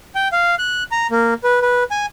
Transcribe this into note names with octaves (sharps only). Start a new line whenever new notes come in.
G5
F5
F#6
A#5
A#3
B4
B4
G#5